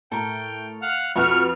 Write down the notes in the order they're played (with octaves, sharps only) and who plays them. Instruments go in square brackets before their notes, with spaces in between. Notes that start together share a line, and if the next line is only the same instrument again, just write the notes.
[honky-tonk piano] A2 [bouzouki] A4 A#4 [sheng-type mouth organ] G5
[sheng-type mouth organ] F5 F#5 F6
[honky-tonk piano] F2 B4 [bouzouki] A3 F#4 F#5 [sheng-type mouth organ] C#6 [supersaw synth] F6